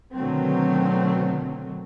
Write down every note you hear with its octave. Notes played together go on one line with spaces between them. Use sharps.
B2 D3 D#3 F#3 A3 C4